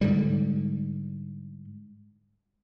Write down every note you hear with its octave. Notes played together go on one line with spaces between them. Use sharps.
G#2 D3 G3